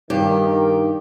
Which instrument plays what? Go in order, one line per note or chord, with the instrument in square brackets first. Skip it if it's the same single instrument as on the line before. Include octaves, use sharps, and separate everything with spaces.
[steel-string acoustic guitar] G2 G4 [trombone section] D#3